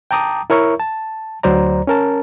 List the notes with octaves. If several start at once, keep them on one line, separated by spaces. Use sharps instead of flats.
G5 A5 A#5 D6 D#6
E4 A#4 C#5 E5 C#6
A5
D2 F#3 C5 D5 A#5
C#4 A#4 A5